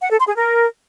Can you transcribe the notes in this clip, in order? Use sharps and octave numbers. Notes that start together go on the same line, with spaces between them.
F#5
A4
C6
G#4
A#4